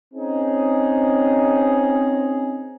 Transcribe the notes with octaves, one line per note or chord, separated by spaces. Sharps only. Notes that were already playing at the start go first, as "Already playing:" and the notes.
C4 C#4 D#4 G#4